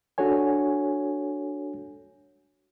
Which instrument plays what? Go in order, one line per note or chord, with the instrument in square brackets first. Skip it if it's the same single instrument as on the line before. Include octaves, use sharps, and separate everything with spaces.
[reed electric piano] D4 F#4 A4 C#5 G#5